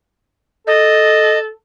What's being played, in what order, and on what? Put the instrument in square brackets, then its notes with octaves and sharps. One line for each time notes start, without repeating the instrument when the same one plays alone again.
[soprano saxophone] A4 [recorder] D#5